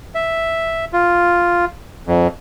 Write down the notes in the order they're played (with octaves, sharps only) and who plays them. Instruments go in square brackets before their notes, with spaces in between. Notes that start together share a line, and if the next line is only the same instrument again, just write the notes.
[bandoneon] E5
F4
F2